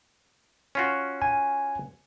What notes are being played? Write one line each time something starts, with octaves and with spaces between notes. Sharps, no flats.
C#4 F4 F#4
G#5